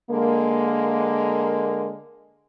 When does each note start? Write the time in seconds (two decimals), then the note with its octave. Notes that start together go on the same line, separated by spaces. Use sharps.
0.10 D3 G#3 A#3